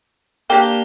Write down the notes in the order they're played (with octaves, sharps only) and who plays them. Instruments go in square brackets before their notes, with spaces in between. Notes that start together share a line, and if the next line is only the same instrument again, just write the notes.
[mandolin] A#3 D4 G4 G5